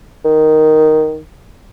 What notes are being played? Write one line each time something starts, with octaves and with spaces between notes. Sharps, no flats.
D#3